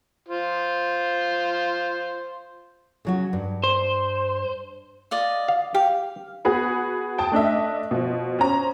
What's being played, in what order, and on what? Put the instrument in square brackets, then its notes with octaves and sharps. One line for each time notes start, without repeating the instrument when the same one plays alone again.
[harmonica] F4 C5
[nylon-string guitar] C#3 F#3 F#4
G2
[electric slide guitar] C5
[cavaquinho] F4 D5 D#5
[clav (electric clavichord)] F5
[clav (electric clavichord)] G4 [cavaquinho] F5
[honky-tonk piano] B3 F#4 G#4 B5
G5 A5 D#6
A3 D4 D#5 E5
B2 F3
C#4 C5 A#5